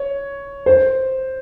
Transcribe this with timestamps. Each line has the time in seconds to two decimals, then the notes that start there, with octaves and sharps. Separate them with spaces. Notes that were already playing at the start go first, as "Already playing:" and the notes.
Already playing: C#5
0.66 C5